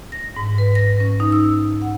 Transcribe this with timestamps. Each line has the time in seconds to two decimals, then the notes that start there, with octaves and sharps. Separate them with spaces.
0.12 A#6
0.36 G#2
0.58 B4
0.75 A#6
1.00 C#4
1.20 D#4
1.32 E6
1.82 F#5